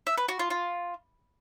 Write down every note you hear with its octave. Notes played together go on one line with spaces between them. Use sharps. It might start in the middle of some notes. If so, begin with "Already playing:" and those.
E5
B4
F#4
F4
F4